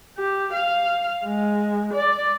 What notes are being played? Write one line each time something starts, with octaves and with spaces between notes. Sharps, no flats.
G4
F5
G#3
D5